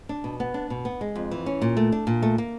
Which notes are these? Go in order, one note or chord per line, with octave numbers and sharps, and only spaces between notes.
D4
B2
B3
D4
B2
B3
G#3
F2
E3
C#4
A#2
A3
D4
A#2
A3
A#3